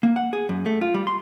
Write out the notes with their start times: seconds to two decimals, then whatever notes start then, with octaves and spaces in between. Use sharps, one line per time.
0.03 A#3
0.16 F#5
0.33 G#4
0.49 F#2
0.66 A3
0.81 F4
0.94 G3
1.07 C6